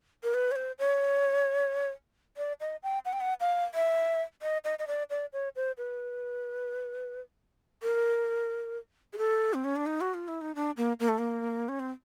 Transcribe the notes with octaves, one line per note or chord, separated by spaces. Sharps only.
A#4
B4
C#5
C5
C#5
D5
D#5
G5
F#5
G5
F#5
F5
E5
D#5
D#5
D#5
D5
D5
C#5
C5
B4
A#4
G#4
A4
C4
C#4
D4
D#4
F#4
F4
E4
D#4
D4
A#3
A#3
A3
A#3
C#4
C4